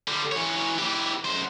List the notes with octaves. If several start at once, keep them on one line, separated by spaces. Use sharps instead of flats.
D3 G3
E3 C#5
E3 G4
F#2 C5